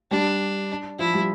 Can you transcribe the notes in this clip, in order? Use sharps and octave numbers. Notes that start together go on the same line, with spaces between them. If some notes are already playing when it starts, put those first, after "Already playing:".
G3 D4
F3 E4
G3